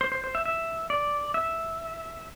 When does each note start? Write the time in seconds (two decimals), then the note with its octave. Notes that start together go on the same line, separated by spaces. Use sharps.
0.01 C5
0.12 C5
0.24 C5
0.35 E5
0.46 E5
0.90 D5
1.34 E5